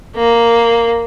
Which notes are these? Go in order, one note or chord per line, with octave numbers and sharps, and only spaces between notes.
A#3